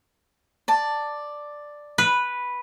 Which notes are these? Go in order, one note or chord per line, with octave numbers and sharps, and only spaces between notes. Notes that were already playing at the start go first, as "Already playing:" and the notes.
D5 A5
B4